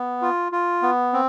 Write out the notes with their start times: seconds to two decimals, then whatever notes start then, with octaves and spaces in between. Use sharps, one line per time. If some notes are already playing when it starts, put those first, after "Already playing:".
Already playing: B3
0.22 F4
0.52 F4
0.82 B3
1.13 C4